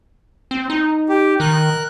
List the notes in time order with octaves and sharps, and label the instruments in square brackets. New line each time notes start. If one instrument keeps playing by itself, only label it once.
[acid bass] C4
D#4
[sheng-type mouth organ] G4
[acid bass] D#3 [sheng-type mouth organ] A#4 F#6